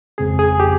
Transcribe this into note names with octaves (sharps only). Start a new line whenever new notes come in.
G1 F2 C#3 G#3 C4 G#4
G#4
G4